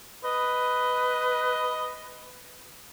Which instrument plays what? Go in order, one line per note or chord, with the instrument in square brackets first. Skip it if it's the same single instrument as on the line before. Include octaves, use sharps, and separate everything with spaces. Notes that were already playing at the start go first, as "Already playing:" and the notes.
[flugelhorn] B4 [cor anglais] D#5